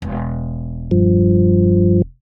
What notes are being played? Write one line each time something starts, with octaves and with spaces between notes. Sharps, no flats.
E1
G2 F3